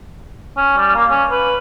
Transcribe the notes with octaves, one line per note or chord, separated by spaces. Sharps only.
C#4
G3
A#3
C#4
B4